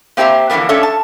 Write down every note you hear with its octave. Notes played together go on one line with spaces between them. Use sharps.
A#3 C4 G4 E5 A#5
D3 E3 F3 G3 A#3 B3
G2 C#4 D4 A4 C#5 E5
A5